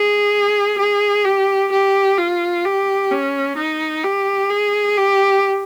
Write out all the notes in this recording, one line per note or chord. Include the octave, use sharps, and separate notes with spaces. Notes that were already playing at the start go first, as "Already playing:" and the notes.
Already playing: G#4
G#4
G4
G4
F4
G4
C#4
D#4
G4
G#4
G4